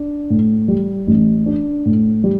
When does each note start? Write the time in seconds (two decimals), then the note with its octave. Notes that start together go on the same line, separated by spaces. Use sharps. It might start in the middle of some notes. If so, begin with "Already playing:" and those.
Already playing: D4
0.30 A2
0.68 G3
1.07 A1
1.46 D4
1.85 A2
2.24 G3